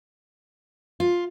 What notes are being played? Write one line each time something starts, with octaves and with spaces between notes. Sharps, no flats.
F4